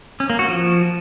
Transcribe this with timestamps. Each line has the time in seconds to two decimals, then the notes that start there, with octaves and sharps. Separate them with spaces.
0.20 C#4
0.30 A#3
0.39 F#4
0.48 F3